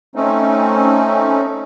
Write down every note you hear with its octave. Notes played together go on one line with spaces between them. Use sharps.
A3 C4 C#4 D#4